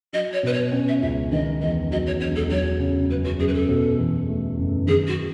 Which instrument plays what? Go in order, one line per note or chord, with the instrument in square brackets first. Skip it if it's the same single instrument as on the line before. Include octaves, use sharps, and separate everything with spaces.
[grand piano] F#3 [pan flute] D#5
[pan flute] C#5
[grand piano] B2 [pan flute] B4
[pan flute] C#5
[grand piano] C#4
[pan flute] E5
[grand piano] C#2 [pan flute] E5
[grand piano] D#3 [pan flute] D#5
[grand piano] E2 [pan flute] D#5
[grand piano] F#3 [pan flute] D#5
[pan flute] C#5
[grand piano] E1 [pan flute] C#5
[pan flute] A4
[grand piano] F#3 [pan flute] C#5
[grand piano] C#3
[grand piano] F#2 [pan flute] B4
[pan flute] F#4
[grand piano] F#2 [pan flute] G#4
[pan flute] B4
A4
[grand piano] B2
E2
A3
F#1
[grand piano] D#3 [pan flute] G#4
[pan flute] F#4